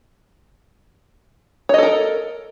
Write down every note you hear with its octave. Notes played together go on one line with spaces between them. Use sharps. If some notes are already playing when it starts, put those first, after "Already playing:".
A4 A#4 C#5 D#5